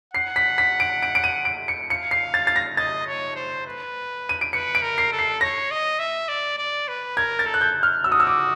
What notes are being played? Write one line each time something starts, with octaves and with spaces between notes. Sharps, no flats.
F#5 C7
B6
B6
D7
D7
D7
D#7
D7
C#7
F5 C#7
C7
A6
A6
A#6
D#5 A6
C#5
C5
B4
D#7
D7
B4 C#7
D7
A#4
C7
A4
C7
C#5 A#6
D#5
E5
D5
D5
B4
A#4 G#6
A6
A4
F#6
G6
F6
F#4 E6
D#6
E6
D6